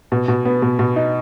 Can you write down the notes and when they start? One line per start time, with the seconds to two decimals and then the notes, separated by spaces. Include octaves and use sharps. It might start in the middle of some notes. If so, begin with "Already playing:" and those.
0.12 B2
0.28 B2
0.45 B3
0.62 B2
0.79 B2
0.96 D#4